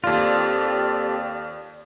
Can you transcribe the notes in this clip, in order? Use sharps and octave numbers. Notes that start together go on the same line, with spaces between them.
D#2 C4 F4 G4 A4 D5 F5